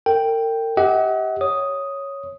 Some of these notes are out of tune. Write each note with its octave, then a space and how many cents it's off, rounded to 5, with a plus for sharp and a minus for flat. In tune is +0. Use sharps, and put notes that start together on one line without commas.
A#4 -40 G5 +0
G4 +0 D#5 +45 F#5 +15
C#5 +0 D#6 +0